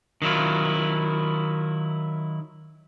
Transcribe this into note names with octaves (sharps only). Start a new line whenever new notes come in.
D#3 F#3 E4 F4